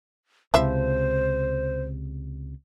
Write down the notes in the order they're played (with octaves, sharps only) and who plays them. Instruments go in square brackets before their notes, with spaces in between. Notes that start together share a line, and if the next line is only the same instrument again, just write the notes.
[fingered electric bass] C#2 C3 [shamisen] F3 E4 E5 [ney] C5